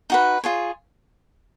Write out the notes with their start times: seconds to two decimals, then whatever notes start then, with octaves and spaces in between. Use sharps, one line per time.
0.10 D#4 F#4 B4
0.44 F4 G#4 C#5